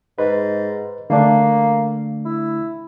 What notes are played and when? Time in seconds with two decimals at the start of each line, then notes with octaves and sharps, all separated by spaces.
0.18 G#2 B4
1.10 D3 A3 A#3 D4
2.25 E4